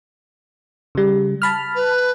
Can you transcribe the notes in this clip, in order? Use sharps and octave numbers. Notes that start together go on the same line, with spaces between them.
C#3 G3
A5 B5 F6
B4